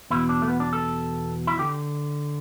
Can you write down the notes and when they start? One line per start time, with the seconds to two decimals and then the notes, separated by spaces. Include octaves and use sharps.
0.10 E2 B2 E4
0.29 D4
0.42 A3
0.48 B3
0.60 D4
0.73 A4
1.47 E4
1.59 D3 G4